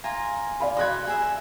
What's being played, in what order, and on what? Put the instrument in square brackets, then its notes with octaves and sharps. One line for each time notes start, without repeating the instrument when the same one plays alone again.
[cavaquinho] F4 G#5 A#5
[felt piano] D5 F5 B5
[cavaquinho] D#5 B5 [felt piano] C6 F#6 G#6
[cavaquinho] G#4 E5